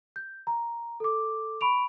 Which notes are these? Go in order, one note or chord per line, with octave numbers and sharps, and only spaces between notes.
G6
A#5
A4 D6
B5 C#6 D7 F7